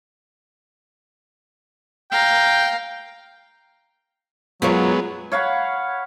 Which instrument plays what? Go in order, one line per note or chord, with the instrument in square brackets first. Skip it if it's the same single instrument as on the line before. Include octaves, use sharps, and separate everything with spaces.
[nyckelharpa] F5 A#5 [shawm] G5
[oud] F#2 F4 C#5 [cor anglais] F#3 [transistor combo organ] G#3 B3
[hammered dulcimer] C#5 F5 F#5 B5